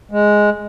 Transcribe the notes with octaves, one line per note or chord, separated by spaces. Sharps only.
G#3